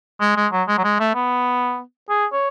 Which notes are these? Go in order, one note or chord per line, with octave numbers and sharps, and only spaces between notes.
G#3
G#3
F#3
G#3
F#3
G#3
A3
B3
G#4
C#5